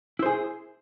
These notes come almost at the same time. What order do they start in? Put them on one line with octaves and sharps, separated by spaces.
E4 C5 G#4